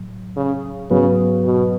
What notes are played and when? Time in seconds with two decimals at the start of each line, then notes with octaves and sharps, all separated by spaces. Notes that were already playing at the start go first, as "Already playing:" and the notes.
Already playing: A2 F#3
0.36 C#3
0.90 G#2 C#3 F#3 B3 F#4 B4
1.45 B2